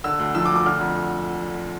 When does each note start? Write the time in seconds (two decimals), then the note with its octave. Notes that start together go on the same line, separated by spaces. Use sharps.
0.04 D3 E6
0.19 D2
0.35 F3 E6
0.46 D6
0.50 D2
0.56 D6
0.66 D3 F6
0.81 F2